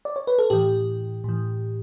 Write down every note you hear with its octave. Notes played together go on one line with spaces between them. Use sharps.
D5
C#5
B4
A4
A2 E3 G4
A2 E3